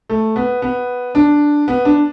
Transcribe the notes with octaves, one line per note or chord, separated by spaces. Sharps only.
A3
B3
B3
D4
B3
D4